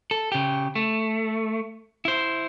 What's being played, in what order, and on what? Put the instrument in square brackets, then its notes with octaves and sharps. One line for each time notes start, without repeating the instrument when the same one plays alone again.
[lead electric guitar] A4
C#3 G4
A3
E4 C5